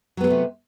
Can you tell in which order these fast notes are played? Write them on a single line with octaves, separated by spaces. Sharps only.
F#3 B3 G#3 A3 C3